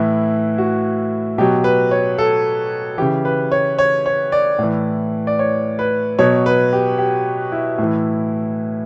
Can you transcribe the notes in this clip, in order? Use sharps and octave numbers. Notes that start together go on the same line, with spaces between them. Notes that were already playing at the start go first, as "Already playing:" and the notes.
Already playing: A2 E3 E4
F#4
B2 F#3 G4
B4
C#5
A4
C#3 E3 G4
B4
C#5
C#5
C#5
D5
A2 E3
D5
C#5
B4
B2 F#3 C#5
B4
G4
G4
E4
A2 E3